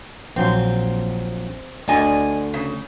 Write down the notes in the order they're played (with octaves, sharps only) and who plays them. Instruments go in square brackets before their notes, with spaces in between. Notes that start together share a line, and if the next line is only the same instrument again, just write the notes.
[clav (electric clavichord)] A#1 F#3 G5 [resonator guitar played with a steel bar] C4
[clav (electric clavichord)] D2 D3 [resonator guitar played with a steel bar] D5 D#5 G#5
[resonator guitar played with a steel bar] C#3